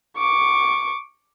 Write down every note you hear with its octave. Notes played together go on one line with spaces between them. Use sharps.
C#6 D6